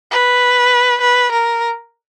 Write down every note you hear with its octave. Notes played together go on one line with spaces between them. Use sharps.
B4
B4
A#4